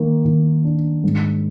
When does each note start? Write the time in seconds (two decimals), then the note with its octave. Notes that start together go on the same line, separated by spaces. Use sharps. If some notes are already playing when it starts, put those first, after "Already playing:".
Already playing: D#3 A#3
0.25 D#3
0.64 D4
1.04 G#2